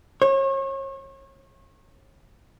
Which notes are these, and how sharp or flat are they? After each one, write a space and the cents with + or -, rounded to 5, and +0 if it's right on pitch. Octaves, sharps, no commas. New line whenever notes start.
C#5 -35